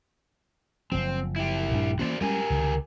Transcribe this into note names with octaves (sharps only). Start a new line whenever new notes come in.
F#1 F3 C4
E4 G4
A#1 G2 D4
E3 A#3 C#4 F#4 C5 D5
G3 G#3 C#4 G4 A#4 G#5
C#2 D3 D#3